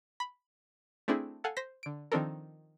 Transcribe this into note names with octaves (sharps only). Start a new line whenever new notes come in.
B5
A3 C4 D4 E4 G#4
A4 F5 F#5 G#5
C5 A#6 B6
D3 D7
D#3 F3 C4 D4 A4 A#4